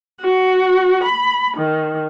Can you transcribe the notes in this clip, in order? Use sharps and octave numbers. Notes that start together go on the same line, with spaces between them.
F#4
B5
D#3